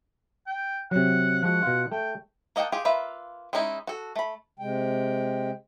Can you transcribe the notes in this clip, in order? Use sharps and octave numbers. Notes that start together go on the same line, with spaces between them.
G5
C3 F#3 F#5
F3 G#3 F#4 F#5
B2 F4
A3 G5
A#3 D#5 F#5 G5 A5
F4 G4 G#4
A#3 F4 B4 E5
G#3 C#4 D#4 E4
F#4 A4
A3 B5
C3 G#3 G5